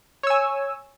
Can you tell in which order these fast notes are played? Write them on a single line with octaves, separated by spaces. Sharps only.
C#5 E6 G#5